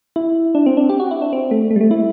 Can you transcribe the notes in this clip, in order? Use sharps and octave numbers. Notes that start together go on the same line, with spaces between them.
E4
D4
C4
D4
G4
F#4
E4
D4
C4
A3
A3
G3
A3
E4